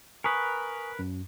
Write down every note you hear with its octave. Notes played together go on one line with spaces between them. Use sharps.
A#4 B4 G#5 C#6 D#6
F#2